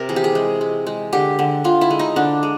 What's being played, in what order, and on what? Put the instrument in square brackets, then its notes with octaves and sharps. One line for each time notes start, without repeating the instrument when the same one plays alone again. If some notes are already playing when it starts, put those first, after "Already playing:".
Already playing: [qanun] C3 A#4
E3 G#4
G4
G#4
G#3
G#3
G#3
D3 G4
D3
D3 F4
E4
G#3
D#4
D3 D4
G#3